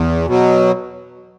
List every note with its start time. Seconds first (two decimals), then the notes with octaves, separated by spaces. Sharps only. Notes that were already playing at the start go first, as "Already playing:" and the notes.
Already playing: E2
0.27 B2 F#3